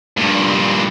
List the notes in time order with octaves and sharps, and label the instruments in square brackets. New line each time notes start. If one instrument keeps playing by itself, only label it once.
[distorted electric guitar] G2 A#2